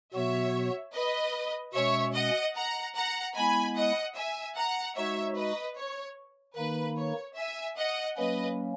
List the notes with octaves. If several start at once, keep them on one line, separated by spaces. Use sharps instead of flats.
B2 F#3 B3 F#4 C#5 E5
B4 D#5
B2 G#3 C#4 C#5 E5
D#5 F#5
F#5 A#5
F#5 A#5
G#3 B3 E4 G#5 B5
D#5 F#5
E5 G#5
F#5 A#5
G#3 D#4 F#4 C#5 E5
B4 D#5
C#5
D#3 A#3 D#4 B4
C#5
E5 G#5
D#5 F#5
F#3 A#3 C#4 B4 D#5